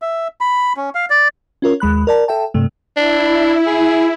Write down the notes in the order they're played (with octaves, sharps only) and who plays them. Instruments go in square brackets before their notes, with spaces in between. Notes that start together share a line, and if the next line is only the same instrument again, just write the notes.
[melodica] E5
B5
C#4
F5
D5
[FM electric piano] C#4 F4 A#4 C#5
D#2 G#3 B5 F#6
A#4 D5 A5
A4 E5 G5 A5
G2 C3 A3
[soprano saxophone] D4 [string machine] E4
[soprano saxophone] G#4